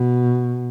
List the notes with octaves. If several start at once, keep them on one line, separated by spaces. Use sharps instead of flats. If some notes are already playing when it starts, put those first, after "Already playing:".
Already playing: B2